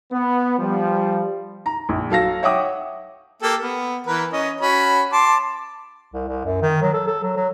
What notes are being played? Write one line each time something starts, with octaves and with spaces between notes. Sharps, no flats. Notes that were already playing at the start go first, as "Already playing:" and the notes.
B3
F3 G3
A#5
A#1
F#3 A4 F5 A#6
C#5 E5 F#5 G5 D6 D#6
A#3 G4 A4
B3
E3 A#4 B4
C#4 D#5
C#4 F#4 B5
A5 C6 D6
C2
C2
F#2
D#3
F#3
A4
A4
F#3
F#3